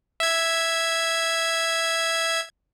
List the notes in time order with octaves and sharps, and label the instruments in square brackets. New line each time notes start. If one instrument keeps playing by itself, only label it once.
[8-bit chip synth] E5 G#6